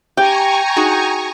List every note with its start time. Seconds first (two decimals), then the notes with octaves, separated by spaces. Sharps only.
0.17 G4 G5 G#5 A#5 C#6
0.76 D#4 F#4 G#4